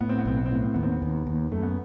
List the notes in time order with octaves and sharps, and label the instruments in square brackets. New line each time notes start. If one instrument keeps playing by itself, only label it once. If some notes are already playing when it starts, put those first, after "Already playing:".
[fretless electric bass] A2 [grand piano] B3
[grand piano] C4
B3
[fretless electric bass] B1 [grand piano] C4
[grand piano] B3
C4
[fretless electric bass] A2 [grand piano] B3
[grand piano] C4
[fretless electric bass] D#2 [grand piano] B3
[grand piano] C4
B3
[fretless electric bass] D#2
D#2
[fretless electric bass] F#2 [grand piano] A3
[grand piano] B3